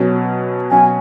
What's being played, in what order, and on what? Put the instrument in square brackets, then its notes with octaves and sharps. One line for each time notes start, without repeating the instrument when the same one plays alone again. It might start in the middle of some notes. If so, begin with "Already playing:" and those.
Already playing: [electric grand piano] B2 F#3 C#4
[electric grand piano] B2 F#3 C#4 F#4 [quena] G#5